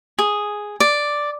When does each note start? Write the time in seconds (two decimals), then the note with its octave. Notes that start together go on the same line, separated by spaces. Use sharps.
0.19 G#4
0.80 D5